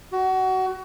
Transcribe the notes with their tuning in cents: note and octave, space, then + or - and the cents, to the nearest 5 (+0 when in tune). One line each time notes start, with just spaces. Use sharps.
F#4 +25